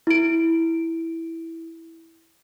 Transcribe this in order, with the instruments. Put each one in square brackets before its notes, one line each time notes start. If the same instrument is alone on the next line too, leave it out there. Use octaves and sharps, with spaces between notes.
[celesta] E4 D7